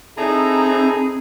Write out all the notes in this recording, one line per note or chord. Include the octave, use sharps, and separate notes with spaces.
C4 D#4 E4 G#4 A4 A#5